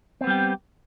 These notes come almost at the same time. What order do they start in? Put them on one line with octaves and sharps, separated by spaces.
C4 B3 G3 G4